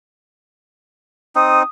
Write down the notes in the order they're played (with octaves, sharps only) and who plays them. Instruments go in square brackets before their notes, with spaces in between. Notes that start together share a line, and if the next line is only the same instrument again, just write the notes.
[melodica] C4 D#4 [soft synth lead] D#6